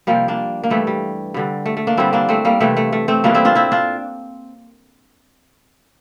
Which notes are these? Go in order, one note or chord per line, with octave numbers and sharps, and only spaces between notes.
C3 F3 G3 A#3
A#3 D4
A#3
G2 E3 G3 A3
G3
G2 D3 G3
A3
A3
A#3 D4
G2 D3 G3 C4 E4
A#3 D4
A3 C4
G3 A#3
C3 E3 G3 A3
A3
A3
A3 C4
A2 E3 G3 A#3 D4
C4 E4
D4 F4
C4 E4
D4 F4